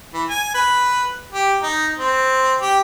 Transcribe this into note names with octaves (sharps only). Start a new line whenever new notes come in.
E3
G#5
B4
G4
D#4
C4
G4